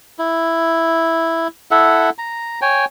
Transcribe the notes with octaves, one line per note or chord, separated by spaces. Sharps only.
E4
E4 A4 E5 F#5
A#5
C#5 G5 G#5